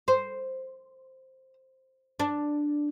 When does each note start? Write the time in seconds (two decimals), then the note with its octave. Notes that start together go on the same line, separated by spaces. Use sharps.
0.08 C5
2.20 D4